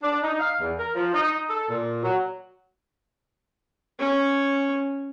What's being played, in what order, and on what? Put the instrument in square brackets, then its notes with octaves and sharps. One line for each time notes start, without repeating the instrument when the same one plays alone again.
[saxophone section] D4
D#4
F5
E2
A#4
F3
D#4
A4
A#2
F#3
[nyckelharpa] C#4 C#5